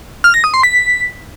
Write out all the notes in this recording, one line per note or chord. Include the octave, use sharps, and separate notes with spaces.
F6
A#6
D#6
C6
B6